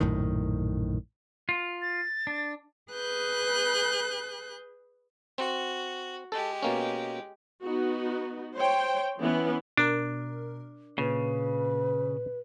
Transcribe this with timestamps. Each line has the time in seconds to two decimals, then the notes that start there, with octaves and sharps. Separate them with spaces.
0.01 A#1 F#2 A2 D#3
1.49 F4
1.82 A6
2.27 D4
2.93 G#4 B4 F#6 G6
5.38 C4 F#4
6.32 G#3 G4 A4
6.63 B2 A#3 C#4
7.64 B3 D#4 F#4
8.56 C5 C#5 G5
9.21 E3 B3 C#4 E4
9.77 B2 D4 A#4
10.98 A#2 C#3 B4